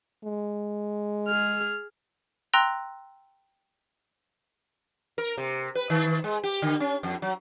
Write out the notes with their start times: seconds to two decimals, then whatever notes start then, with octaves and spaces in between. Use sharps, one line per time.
0.24 G#3
1.28 G#4 F6
2.53 G5 A#5 C6 E6 F#6 A#6
5.18 A#4
5.37 C3
5.75 B4
5.90 D#3
6.24 G#3
6.43 G4
6.62 D3
6.80 C#4
7.03 F2
7.22 F#3